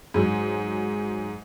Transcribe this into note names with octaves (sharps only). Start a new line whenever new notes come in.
G#2 F#3